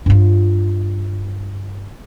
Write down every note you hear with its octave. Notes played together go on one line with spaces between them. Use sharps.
G2 F4